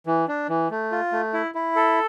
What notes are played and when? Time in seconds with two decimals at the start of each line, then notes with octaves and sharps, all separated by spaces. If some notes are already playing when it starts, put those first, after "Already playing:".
0.06 E3
0.28 D4
0.49 E3
0.71 A3
0.91 F4
1.12 A3
1.33 E4
1.55 E4
1.76 A4